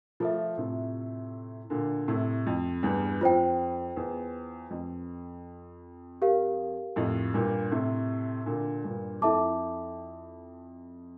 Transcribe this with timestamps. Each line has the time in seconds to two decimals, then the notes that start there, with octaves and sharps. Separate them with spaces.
0.20 F3 A3 F4 A4 E5
0.57 A2 C3
1.70 A#2 D3
2.08 A2 C3
2.46 F2
2.83 E2 G2
3.21 F2 F4 C5 G5
3.96 E2
4.70 F2
6.22 G4 A#4 F5
6.96 F2 A2
7.34 G2 A#2
7.71 A2 C3
8.46 A#2 D3
8.84 G2 A#2
9.21 F2 E4 A4 E5 A5 D6